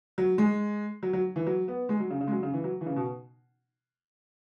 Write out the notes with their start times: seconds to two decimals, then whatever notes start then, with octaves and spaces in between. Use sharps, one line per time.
0.18 F#3
0.38 G#3
1.03 F#3
1.13 F#3
1.36 E3
1.47 F#3
1.68 B3
1.89 G#3
2.00 F#3
2.10 C#3
2.21 C#3
2.27 G#3
2.32 F#3
2.43 C#3
2.53 E3
2.64 F#3
2.81 E3
2.86 C#3
2.96 B2